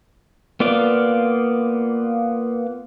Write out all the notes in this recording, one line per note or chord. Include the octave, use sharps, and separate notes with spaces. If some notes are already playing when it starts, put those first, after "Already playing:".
A#3 B3 F4 D5 F5